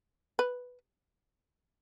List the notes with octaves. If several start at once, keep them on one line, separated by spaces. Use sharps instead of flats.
B4